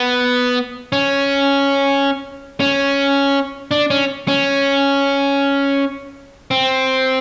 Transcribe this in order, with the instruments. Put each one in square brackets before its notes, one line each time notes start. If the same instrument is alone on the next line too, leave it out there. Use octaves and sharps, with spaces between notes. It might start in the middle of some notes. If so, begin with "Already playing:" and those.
Already playing: [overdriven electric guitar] B3
C#4
C#4
D4
C#4
C#4
C4